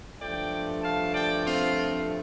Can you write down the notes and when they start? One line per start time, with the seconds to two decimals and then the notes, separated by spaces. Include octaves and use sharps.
0.20 G2 F3 A3 D5 G5
0.83 F5 A5
1.14 D5 G5
1.46 C4 F4